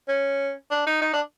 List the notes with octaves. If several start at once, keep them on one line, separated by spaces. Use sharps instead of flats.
C#4
D4
D#4
D#4
D4